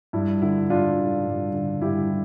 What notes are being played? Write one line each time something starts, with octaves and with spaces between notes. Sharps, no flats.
G2 E4
D3 E4
G2 D4 F4
D3
G2
D3
G2 E4 G4